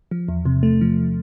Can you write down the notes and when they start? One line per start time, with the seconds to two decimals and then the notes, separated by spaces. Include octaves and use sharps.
0.11 F3
0.28 E2
0.45 C3
0.63 A3
0.81 F3